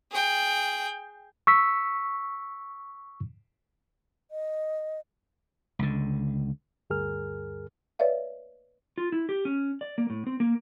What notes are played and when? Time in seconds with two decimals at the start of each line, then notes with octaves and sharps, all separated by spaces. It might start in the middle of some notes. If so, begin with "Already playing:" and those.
0.11 G#4 G5
1.47 C#6 E6 B6
4.31 D#5
5.79 C#2 D3
6.90 D2 G2 G#4 A#4 F6
7.99 B4 C#5 D5 E5 F5
8.98 F4
9.12 E4
9.29 G4
9.45 C#4
9.81 D5
9.98 A#3
10.10 A2
10.27 C4
10.40 A#3